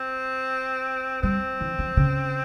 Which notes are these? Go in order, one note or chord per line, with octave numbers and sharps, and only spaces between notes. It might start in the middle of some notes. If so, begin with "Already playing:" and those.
Already playing: C4
G3 C4
E3
F3
C#3